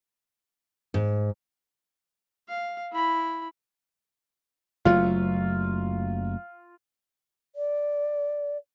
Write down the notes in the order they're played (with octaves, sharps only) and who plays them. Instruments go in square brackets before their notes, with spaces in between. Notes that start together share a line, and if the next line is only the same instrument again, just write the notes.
[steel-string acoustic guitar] G#2
[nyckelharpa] F5
E4 B5
[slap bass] F#1 F#3 A3 [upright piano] F4
[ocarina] D5